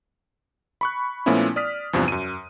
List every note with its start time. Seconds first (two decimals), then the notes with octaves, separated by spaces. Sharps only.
0.81 B5 C#6 F#6
1.26 A#2 F3 A3 B3 C#4 E4
1.56 D5 D#6 F6 B6
1.93 E2 G2 C3 F3
2.08 F#2 D#7